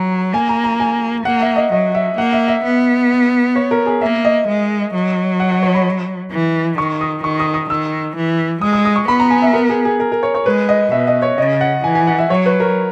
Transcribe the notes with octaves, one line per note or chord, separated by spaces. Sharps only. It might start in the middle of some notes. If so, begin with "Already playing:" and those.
Already playing: F#3 A#5
A#3 G#5
A#5
A#5
G#5
A#3 F#5
E5
D#5
F#3 D#5
E5
A#3 F#5
E5
E5
B3
C#5
A#4
G#4
A#3 E5
D#5
G#3
F#3
F#5
F#5
C#5
B5
E3
D#3 C#6
D#6
D#3 C#6
D#6
D#6
D#3 E6
E3
G#3 D#6
D#6
D#6
C#6
B3 B5
A#5
G#5
E5
A#4
G#4
G#4
A#4
A#4
C#5
C#5
G#3 B4
D#5
B2 E5
D#5
C#5
C#3 D#5
F#5
E3 G#5
G#5
F#5
E5
F#3 C#5
B4
A#4